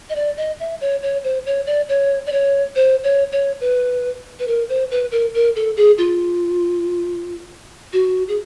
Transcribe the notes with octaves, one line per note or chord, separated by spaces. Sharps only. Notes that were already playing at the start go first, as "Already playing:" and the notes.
D#5
D5
D#5
E5
C#5
C#5
C5
C#5
D5
C#5
D5
C#5
C5
C#5
C#5
B4
B4
A#4
C5
B4
A#4
A#4
A4
G#4
F4
F#4
G#4